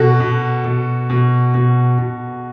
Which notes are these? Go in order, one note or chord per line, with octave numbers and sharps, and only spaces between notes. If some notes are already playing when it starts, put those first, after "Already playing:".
Already playing: B2 F#4 A4
B2
B2
B2
B2
B2